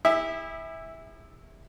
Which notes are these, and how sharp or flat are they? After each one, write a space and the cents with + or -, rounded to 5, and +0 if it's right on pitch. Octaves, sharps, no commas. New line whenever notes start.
E4 -15 G#4 -45 E5 +0